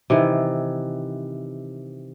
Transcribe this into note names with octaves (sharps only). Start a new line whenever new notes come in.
C3 D#3 E3